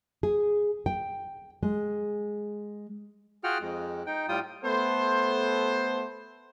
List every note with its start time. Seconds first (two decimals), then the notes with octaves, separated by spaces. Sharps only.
0.23 G#4
0.86 G5
1.63 G#3
3.44 F4 F#4 G#4 F#5 G5 F6
3.61 F2 G#3
4.07 D#4 G5
4.29 A2 G3 F4 G5 D#6
4.65 A3 B3 A4 C5